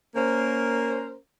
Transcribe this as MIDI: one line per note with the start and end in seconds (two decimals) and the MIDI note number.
0.15 1.16 58
0.15 1.16 61
0.15 1.16 70
0.15 1.16 72